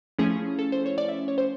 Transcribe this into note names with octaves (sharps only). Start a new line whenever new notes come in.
F3 A3 C#4 E4 G#4
A4
C5
C#5
D5
E5
C#5
C5